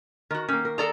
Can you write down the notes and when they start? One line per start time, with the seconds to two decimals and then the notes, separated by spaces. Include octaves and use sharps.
0.31 D#3 F#4 A#4
0.48 D#3 A#3 C#4
0.65 A#4
0.78 G#4 A4 D5 A#5